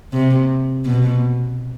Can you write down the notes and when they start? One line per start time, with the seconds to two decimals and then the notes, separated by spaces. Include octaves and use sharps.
0.12 C3
0.85 B2